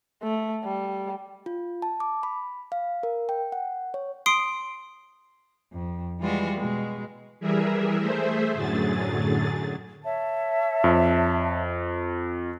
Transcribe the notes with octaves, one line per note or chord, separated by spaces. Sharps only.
A3
G3
F4
A5
D6
B5
F5
A#4
G5
F#5
C#5
C6 D#6 C7 D7
F2
E3 G3 G#3 F4 F#4
B2 G#3
E3 G3 G#4 A#4 E5
A3 G#4 C5 E5
F#2 A2 D3 F#3 G#4 A6
C#5 E5 A5
F2